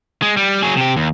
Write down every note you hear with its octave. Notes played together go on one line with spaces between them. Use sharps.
G#3
G3
F#3 G#4
C3 G4
D#2